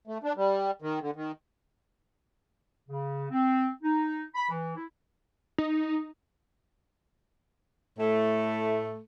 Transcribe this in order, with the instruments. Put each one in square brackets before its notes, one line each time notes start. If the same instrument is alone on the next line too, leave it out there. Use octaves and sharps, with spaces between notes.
[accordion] A3
D4
G3
D#3
D3
D#3
[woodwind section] C#3
C4
D#4
B5
E3
E4
[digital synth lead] D#4
[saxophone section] A2 A3